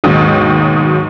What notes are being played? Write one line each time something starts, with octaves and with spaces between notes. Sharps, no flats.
D#2 G#2 B2 D#3 F#3